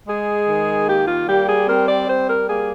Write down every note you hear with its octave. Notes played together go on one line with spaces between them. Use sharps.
G#3 G#4
D#3
A#3 G4
F4
G3 G4
G#4
C4 A#4
D5
G3 C5
A#4
A#3 G#4